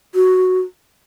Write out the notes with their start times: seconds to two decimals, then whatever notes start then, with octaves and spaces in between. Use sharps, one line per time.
0.15 F#4